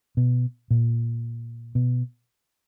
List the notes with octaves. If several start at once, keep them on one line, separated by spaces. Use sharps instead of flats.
B2
A#2
B2